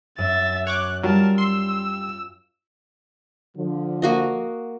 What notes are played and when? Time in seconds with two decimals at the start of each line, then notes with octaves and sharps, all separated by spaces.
0.18 F#2 E5 A6
0.67 C#5 C#6 D6 F#6
1.03 F#3 G3 F4 A#4 A5
1.38 C6 E6
3.56 D3 F3
4.02 A#3 F#4 D#5